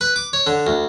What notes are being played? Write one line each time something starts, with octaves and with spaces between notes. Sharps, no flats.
B4
D6
C#5
D3
D2